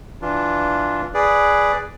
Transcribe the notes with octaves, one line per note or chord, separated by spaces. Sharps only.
E3 D4 F4
G#4 B4 D5